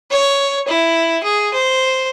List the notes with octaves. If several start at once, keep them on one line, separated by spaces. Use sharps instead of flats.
C#5
E4
G#4
C5